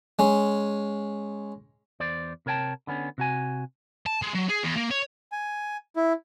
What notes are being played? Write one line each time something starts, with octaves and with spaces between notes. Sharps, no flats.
G#3 C#4
E2 C5 D5
C3 A#4 C#5 G5 A5
D3 B3 C#4
C3 F#4 G#5
A5
G#3
F#3
G#4
E2
A#3
C#5
G#5
E4